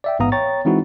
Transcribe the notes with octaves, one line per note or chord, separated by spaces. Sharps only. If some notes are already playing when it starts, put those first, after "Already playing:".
D5 E5 G5
A1 G#2 B3 F5 A#5 D#6
C#5 G5 A#5 C#6 A6
E3 G#3 C4 D#4 E4 F#4